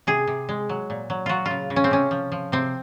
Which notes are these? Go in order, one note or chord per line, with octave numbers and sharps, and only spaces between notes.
C3 G#4
C3
G#3
F#3
A#2
F#3
F#3 F4 F#4
C#3 F4
C#3
C#4
C4
C3 C#4
F3
F3
C3 C4